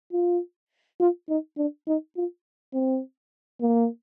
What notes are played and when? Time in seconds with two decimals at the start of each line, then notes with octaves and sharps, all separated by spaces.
0.12 F4
1.00 F4
1.29 D#4
1.57 D4
1.87 D#4
2.17 F4
2.74 C4
3.61 A#3